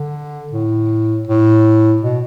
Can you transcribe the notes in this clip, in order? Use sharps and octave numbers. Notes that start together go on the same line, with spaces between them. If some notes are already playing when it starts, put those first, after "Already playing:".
Already playing: D3
A2
A2
B2